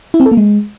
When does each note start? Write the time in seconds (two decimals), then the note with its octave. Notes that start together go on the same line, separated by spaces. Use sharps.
0.14 E4
0.20 C4
0.26 A4
0.31 A#3
0.37 G#3